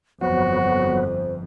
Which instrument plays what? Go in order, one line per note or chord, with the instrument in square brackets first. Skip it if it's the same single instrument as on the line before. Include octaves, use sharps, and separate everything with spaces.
[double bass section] G1 F2 [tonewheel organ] F#3 B3 [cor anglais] F#4 [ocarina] C5